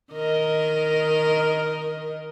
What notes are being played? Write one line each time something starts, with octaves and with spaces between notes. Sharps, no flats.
D#3 A#4 D#5